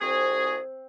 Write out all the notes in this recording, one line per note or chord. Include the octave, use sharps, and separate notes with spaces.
C2 C4 F#4 G#4